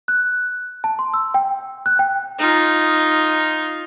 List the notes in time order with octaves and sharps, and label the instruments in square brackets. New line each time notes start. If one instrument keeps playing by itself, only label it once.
[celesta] F#6
A5
C6
E6
G5
F#6
G5
[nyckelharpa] D#4 F4